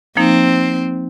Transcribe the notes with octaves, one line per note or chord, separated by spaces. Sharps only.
F3 A#3 C4 D#4